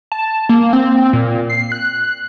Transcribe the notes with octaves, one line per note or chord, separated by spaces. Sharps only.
A5
A#3
C4
A#2
C7
F#6